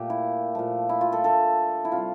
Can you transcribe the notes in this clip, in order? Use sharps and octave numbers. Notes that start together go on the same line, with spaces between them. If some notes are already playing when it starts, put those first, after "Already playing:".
Already playing: A#2 A3 G4
E4
A#2 F3 A3
E4
F4
A4
D3 A3 A4
E4
C3 G3 F4